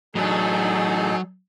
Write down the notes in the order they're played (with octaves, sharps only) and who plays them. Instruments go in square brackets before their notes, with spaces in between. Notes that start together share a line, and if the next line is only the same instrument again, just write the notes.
[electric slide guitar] A2 E3 D4 [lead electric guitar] F#3 [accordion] D#4 G#4 A4